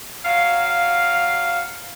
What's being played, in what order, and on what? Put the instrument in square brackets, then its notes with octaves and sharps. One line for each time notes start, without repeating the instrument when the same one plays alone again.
[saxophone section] F#3 F5